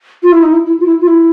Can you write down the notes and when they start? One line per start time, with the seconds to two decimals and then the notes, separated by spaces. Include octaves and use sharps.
0.23 F4
0.32 E4
0.43 D#4
0.53 E4
0.65 E4
0.80 F4
0.86 E4
1.01 F4
1.07 E4